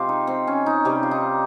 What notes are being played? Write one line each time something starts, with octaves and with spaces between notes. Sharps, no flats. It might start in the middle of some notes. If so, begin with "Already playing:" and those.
Already playing: C3 F3 G#3 C4 F4 G4
D#4
C4
C#4
D#4
C3 G3 G4
F4
D#4